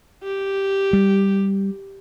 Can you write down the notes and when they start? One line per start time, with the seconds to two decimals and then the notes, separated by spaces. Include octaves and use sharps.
0.23 G4
0.93 G3